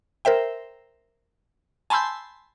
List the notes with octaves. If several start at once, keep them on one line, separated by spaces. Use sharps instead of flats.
A#4 C5 E5 G5
G#5 A5 B5 C6 E6 G6